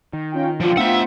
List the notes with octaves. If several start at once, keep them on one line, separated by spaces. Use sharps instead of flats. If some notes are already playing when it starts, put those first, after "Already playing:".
D#3
C#4 F4 G5
D3 F3 F4 G5
A3 B3 D4 C5 E5 F#5